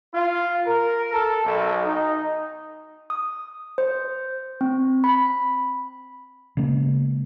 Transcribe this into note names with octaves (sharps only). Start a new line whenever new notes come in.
F4
A#4
A4
B1
D#4
D#6
C5
C4
B5
C#3 G#3 A#3 B3